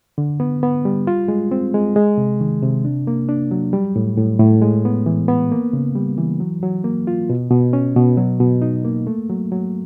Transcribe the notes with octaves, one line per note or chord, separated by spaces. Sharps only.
D3
B3
B3
G3
F4
G#3
C4
G#3
G#3
C3
D#3
C3
D4
A#3
D4
F#3
G3
A2
A2
A2
G#3
B3
E3
B3
A#3
C#3
G3
E3
F#3
F#3
A#3
F4
B2
B2
C#4
B2
F#3
B2
D#4
A#3
A3
F#3
F#3